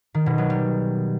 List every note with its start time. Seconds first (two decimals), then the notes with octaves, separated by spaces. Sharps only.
0.14 D#3
0.26 B2
0.38 F#3
0.50 G3